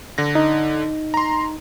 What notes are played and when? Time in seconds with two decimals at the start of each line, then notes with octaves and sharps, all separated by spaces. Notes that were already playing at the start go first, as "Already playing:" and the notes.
0.18 D3 A#6
0.35 D#4
1.14 A#5 C6